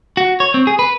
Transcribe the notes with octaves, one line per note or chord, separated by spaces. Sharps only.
F#4
C#5
C4
G#4
B4